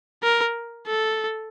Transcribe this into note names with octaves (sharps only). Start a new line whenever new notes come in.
A#4
A4